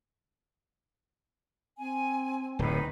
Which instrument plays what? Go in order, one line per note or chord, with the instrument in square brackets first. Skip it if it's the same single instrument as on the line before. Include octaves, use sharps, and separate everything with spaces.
[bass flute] C4 [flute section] G#5
[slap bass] D1 A2 [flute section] D#4 B4